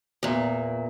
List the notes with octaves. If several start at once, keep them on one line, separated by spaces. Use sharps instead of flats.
E2 A#2